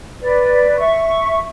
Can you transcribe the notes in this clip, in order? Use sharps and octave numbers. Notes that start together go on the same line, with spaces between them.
B4 D5
E5 C#6